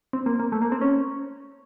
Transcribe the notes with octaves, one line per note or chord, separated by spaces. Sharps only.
C4
A#3
A#3
A3
A#3
C4
C#4